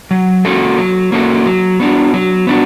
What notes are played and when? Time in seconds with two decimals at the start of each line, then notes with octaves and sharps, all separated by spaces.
0.11 F#3
0.45 A#3 C#4 F#4 A4
0.78 F#3
1.12 A#3 C#4 F#4 A4
1.46 F#3
1.80 B3 D4 F#4
2.14 F#3
2.47 B3 D4 F#4